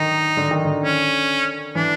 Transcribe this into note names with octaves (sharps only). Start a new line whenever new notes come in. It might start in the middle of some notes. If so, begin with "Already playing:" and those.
Already playing: D3 D#3 D#4
D3
D#3
D3
C#4
E3 D4